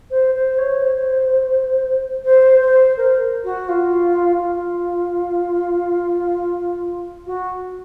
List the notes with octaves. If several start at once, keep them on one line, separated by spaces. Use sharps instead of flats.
C5
C5
C#5
C5
C5
C5
A#4
F#4
F4
F4
F#4